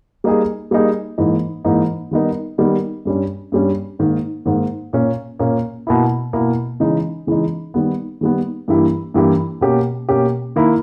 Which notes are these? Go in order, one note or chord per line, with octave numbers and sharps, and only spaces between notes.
G3 A#3 D#4 G#4
G3 A#3 D#4 G#4
G#2 E3 A#3 D#4
G#2 E3 A#3 D#4
D#3 G3 B3 D#4 A#4
D#3 G3 B3 D#4 A#4
G2 G3 C#4
G2 G3 C#4
G#2 D#3 A#3
G#2 D#3 A#3
A#2 A#3 C#4
A#2 A#3 C#4
B2 A#3 E4
B2 A#3 E4
C#3 E3 G#3 D#4
C#3 E3 G#3 D#4
D#3 G3 B3
D#3 G3 B3
G2 E3 A#3 E4 G4
G2 E3 A#3 E4 G4
B2 A#3 C#4 G4
B2 A#3 C#4 G4
D#3 A#3 E4